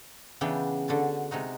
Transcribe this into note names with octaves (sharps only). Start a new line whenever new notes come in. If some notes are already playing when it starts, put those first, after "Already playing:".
C#3 E3 B3 D4 G5
D3 F#4 A5
C3 G#3 D#4 F#4